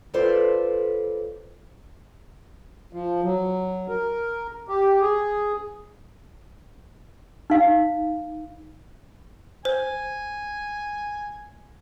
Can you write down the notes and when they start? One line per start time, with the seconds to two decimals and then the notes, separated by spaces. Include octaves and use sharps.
0.14 F4 A4 B4 C5 D5
2.93 F3
3.23 F#3
3.89 A#4
4.68 G4
5.01 G#4
7.50 D#4 F5
9.65 C5 G#5